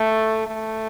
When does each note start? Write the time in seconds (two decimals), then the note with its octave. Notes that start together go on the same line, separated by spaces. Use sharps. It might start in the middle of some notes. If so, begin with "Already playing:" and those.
Already playing: A3
0.46 A3